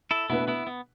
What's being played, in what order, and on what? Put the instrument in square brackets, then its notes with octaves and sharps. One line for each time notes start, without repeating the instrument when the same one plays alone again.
[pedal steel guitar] E4 A4
[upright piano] B2 A3 D4 B4 [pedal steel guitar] B3 E4
[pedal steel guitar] B3 E4
B3